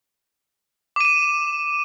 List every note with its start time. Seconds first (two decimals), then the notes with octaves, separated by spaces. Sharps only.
0.96 D6
1.01 D#7
1.05 E7